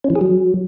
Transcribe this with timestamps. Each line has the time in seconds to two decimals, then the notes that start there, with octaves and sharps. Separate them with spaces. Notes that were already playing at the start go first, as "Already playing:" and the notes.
0.04 C#4
0.10 E3
0.15 G#4
0.21 F#3